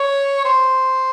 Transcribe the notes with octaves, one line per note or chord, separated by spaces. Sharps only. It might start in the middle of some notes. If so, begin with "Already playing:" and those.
Already playing: C#5
C5